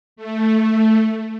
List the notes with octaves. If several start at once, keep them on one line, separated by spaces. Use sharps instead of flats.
A3